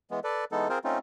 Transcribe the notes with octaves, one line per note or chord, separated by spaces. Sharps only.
E3 G#3 B3
A4 B4 D5
E3 G#3 B3 D#4 A4
C4 F4 G#4 A#4 C5
A3 C4 C#4 D#4 F4